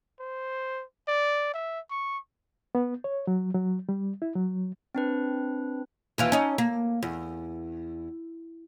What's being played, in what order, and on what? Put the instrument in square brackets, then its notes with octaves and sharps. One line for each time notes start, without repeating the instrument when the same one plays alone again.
[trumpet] C5
D5
E5
C#6
[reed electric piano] B3
C#5
F#3
F#3
G3
E4
F#3
[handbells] C4 D4 B4
[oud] D#2 E3 F4
C#4 D#4
A#3
E2